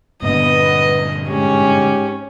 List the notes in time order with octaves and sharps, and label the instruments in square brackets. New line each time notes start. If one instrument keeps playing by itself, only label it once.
[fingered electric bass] G2 A#2 D3 [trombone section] B3 [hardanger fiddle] D#5
[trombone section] G#2 G#3 G4 [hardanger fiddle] C#4